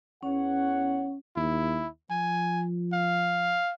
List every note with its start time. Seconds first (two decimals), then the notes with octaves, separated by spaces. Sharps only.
0.23 E2 C#4 C#5 F#5
1.36 D#2 E4
2.10 F3 G#5
2.93 F5